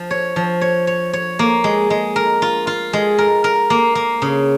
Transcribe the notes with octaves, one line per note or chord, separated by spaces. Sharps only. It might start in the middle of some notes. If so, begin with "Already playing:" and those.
Already playing: F3
C#5
F3
C#5
C#5
C#5
A#3
G#3
G#3
A#4
F4
F4
G#3
A#4
A#4
A#3
A#3
C#3